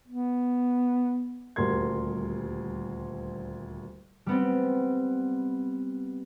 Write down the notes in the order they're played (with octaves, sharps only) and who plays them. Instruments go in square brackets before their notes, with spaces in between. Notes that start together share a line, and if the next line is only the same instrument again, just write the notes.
[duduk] B3
[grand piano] D#1 D2 G3 A#4 C6 G#6
[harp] G3 B3 C4